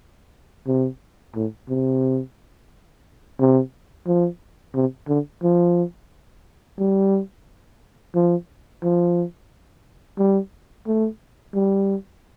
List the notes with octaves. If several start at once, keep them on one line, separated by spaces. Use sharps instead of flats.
C3
A2
C3
C3
F3
C3
D3
F3
G3
F3
F3
G3
A3
G3